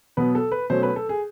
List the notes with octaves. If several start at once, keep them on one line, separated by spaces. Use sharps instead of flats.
B2 F#3 B3 B4
A4
B4
B2 F#3 A3 C#4 C5
B4
A4
G#4